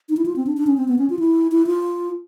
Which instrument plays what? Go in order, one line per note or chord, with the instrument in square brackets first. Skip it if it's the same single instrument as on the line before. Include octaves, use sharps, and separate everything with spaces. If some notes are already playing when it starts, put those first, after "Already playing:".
[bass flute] D#4
E4
F4
C4
D4
D4
C#4
C4
B3
C#4
F4
E4
E4
F4